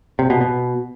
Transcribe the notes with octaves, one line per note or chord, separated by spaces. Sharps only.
C3
B2
B2